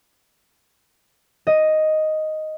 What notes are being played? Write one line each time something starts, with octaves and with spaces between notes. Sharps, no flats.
D#5